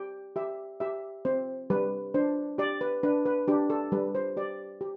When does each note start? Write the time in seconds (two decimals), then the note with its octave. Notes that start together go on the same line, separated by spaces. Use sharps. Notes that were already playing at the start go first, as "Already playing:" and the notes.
Already playing: G4 G5
0.36 G4 E5
0.80 G4 E5
1.25 C4 C5
1.70 G3 B4
2.14 D4 C5
2.58 G4 D5
2.81 B4
3.03 D4 B4
3.26 B4
3.48 D4 G4
3.70 A4
3.92 G3 B4
4.15 C5
4.37 G4 D5
4.81 G4